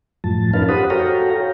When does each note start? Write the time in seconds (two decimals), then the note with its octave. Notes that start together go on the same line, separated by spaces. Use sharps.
0.24 F#2 A2 F3 A5
0.53 C#4 D#4 A#4 B4 F5 A5
0.69 G4 C5 F#5 B5 D#6
0.90 F#4 A4 C#5 F5 G5 A#5